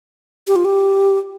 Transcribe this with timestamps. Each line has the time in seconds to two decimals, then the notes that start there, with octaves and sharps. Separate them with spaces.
0.47 G4
0.56 F4
0.65 G4